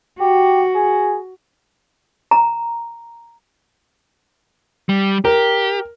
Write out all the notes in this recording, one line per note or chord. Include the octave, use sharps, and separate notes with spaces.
F#4 G4
G#4
A#5
G3
G4 A#4